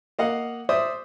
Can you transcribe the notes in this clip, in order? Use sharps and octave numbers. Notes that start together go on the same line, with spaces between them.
A#3 D#5 F5 F#5
C5 D5 E5 D#6